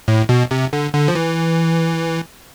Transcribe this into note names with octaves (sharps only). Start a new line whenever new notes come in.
A2
B2
C3
D3
D3
F3
E3